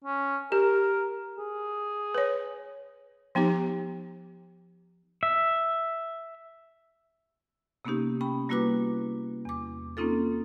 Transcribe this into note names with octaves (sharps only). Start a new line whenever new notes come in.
C#4
G4 A#4
G#4
B4 C#5
F3 B3 D#4 G4
E5
C3 A#3 B3 C#4 D#4 G4
C#4 G5 B5
G3 A#3 E4 F#4 B4 D6
E2 D6
A#3 C4 C#4 D#4 F4 A4